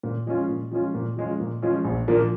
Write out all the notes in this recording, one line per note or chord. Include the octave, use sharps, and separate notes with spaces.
A#2
F3 G#3 C#4 F4
A#2
F3 G#3 C#4 F4
A#2
F3 G#3 C#4 F4
A#2
F3 G#3 C#4 F4
A#1
A#2 F3 A#3 D4